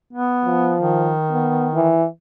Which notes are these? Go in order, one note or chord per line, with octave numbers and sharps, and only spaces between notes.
B3
F3
D#3
B3
E3